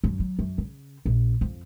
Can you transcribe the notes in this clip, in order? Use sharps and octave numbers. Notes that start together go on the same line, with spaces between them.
F#2
F#3
F#2
C#3
A#1
F2